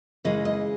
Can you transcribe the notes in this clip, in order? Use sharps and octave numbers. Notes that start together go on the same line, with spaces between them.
C#3 E3 G#3 D#5
D#5